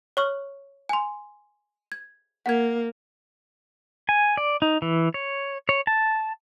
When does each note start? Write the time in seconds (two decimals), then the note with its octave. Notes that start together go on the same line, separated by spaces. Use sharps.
0.17 C#5 C#6 F6
0.89 G#5 C6
1.92 G#6
2.46 A#3 F#5 G#6
4.09 G#5
4.37 D5
4.62 D#4
4.82 E3
5.14 C#5
5.69 C#5
5.87 A5